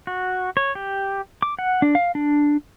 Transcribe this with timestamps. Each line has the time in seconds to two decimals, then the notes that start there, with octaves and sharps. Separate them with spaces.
0.07 F#4
0.57 C#5
0.75 G4
1.42 D6
1.59 F#5
1.82 D4
1.95 F5
2.15 D4